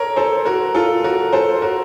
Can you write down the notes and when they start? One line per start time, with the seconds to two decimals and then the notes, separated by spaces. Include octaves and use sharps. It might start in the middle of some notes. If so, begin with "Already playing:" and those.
Already playing: A4 A#4 C#5
0.16 A4 C5
0.45 F#4 A#4
0.75 F4 A4
1.04 F#4 A#4
1.33 A4 C5
1.62 F#4 A#4